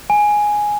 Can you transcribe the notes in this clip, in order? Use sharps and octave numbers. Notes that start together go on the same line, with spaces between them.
G#5